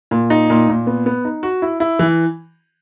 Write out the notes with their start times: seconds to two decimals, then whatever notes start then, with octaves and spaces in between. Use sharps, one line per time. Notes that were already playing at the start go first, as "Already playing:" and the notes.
0.11 A#2
0.30 D#4
0.50 A#2
0.69 A#2
0.87 B3
1.06 B3
1.25 D#4
1.43 F#4
1.62 E4
1.80 E4
1.99 E3